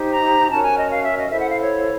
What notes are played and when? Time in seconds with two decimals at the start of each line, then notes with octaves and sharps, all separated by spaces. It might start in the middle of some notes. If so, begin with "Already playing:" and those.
Already playing: D#4 G4 C5
0.11 A#5
0.51 C#4 F#4 A#4 C#5 A5
0.64 G#5
0.77 D#5
0.90 F5
1.04 E5
1.18 D#5
1.30 E4 A4 C5 E5
1.40 F#5
1.50 F5
1.60 C#5